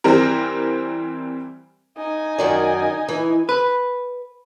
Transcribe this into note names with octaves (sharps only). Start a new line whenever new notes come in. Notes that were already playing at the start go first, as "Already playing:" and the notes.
E3 G3 C4 G4 A#4
D#4 G#5
F#2 D#3 D5
E3
B4